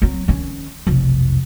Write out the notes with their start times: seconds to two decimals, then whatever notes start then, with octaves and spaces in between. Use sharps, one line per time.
0.02 F#3 C4
0.28 D#3 C#4
0.87 F1 B1